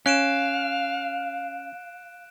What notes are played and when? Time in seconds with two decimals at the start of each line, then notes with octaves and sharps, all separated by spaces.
0.06 C#4 F5 F#6 D7 E7